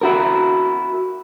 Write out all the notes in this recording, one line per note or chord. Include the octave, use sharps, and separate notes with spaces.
E4 F#4 A#4